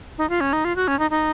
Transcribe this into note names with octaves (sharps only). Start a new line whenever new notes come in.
D#4
F4
C#4
D#4
F4
F#4
C#4
D#4
D#4